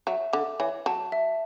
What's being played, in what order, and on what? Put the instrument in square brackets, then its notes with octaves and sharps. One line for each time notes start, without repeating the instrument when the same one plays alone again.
[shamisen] F#3 [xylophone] E5
[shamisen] D3 [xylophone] D6
[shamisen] E3 [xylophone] C#5
[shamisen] F#3 [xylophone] A5
[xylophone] E5